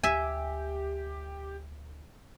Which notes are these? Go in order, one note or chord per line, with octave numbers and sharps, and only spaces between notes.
D2 G4 E5 G#5